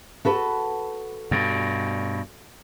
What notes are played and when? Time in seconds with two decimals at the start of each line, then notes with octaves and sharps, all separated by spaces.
0.25 F#4 A4 B4
1.31 G2 B2